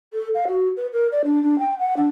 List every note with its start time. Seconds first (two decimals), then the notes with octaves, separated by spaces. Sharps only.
0.13 A4
0.34 F5
0.47 F#4
0.76 B4
0.93 A#4
1.12 D5
1.24 D4
1.42 D4
1.59 G5
1.79 F#5
1.96 D4